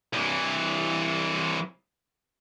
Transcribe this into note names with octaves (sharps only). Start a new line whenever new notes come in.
C2 E3